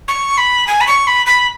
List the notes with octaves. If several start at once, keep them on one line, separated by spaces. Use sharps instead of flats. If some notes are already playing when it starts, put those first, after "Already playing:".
C#6
B5
G#5
B5
C#6
B5
B5